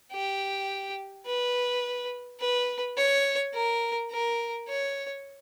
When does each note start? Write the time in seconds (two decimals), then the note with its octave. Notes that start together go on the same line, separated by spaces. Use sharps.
0.12 G4
1.26 B4
2.40 B4
2.98 C#5
3.54 A#4
4.11 A#4
4.69 C#5